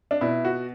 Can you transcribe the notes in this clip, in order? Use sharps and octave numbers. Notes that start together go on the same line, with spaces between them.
D4
B2 E4
F#4